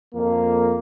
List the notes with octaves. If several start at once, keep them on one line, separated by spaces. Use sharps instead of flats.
F2 A#3